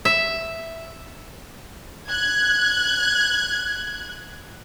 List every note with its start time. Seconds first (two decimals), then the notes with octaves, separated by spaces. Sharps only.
0.05 E5
2.08 F#6 G#6